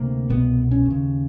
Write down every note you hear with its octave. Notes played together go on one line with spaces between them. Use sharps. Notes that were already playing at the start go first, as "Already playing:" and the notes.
Already playing: D2 C3 A#3
C2 B2 B3
C#4
D#2 C#3